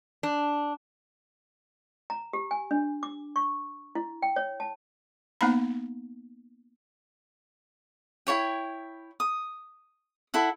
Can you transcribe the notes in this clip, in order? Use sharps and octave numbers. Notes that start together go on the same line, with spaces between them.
D4
A#5
G4
G#5
D4
D6
C#6
E4
G5
C#5
A5
A#3 B3 D#4 F5 A#5 B5
E4 F#4 C#5 G5
D#6
E4 A4 F#5